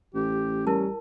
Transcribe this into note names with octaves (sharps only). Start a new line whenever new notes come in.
A1 G4
G3 C#4 E4 A#4 A5